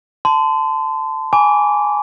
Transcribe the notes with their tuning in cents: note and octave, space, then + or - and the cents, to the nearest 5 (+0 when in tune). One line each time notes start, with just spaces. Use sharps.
A5 +0 C6 -35
G#5 +0 B5 +0 D6 -25